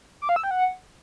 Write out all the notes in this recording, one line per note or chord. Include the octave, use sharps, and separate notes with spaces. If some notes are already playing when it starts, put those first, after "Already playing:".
D6
F5
E6
G5
F#5